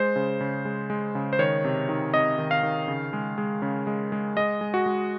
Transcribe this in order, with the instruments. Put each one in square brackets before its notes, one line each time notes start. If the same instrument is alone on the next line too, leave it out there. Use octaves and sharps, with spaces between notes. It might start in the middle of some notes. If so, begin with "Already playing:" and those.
Already playing: [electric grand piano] G#3 C5
C#3
C#3
G#3
G#3
C#3
C5
D#3 C#5
C3
D#3
C3 D#5
D#3
F5
D#3
C#3
G#3
G#3
C#3
G#3
G#3
G#3 D#5
G#3
F#4
G#3